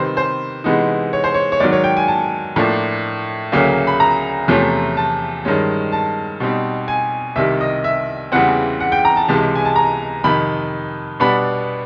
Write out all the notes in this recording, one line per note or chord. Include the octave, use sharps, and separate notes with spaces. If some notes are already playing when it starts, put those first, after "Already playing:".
Already playing: C3 D#3 G3 C4 B4 C5
C5
C3 E3 G#3 B3 D#4
C#5
C5
C#5
C#5
G#2 D#3 F#3 D5
C#5
G5
G#5
A5
A2 F3 A#3 D4
D2 C#3 F#3 A#3 C#4
B5
A#5
E2 C3 F3 A3 C#4
A5
G2 D#3 G#3 C#4
A5
B2 G3 C4 D#4
G#5
C2 C3 D#3 G3 E5
D#5
E5
E2 C#3 E3 G3 C4 F#5
F#5
G5
A#5
A5
C#2 C3 E3 G#3 A5
G#5
A5
A#5
F2 C3 D#3 B5
B2 G3 B3 D4 B5